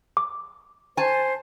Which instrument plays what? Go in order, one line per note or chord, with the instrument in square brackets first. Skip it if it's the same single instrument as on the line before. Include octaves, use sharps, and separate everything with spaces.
[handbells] D6
[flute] C5 [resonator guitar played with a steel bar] G#5 A5